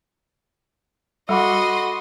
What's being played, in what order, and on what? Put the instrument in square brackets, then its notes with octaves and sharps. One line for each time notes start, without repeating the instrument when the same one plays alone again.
[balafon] G3 [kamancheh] F#4 [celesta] A4 B5 D6 [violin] D#5 C6